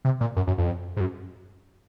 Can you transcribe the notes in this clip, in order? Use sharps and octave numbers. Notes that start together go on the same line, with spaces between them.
C3
A#2
F#2
F#2
F2
G#2
F#2